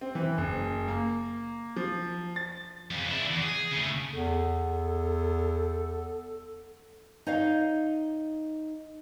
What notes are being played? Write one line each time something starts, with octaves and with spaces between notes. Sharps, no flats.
C4
E3
F#1
A#3
F3
A6
F2 C#3
D4 E4
E2
G#4
C#3 A3
E2 A4
D#4 C#5 D#5 F5